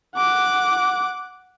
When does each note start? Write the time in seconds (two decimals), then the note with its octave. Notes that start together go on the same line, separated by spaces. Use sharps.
0.15 F#5 D6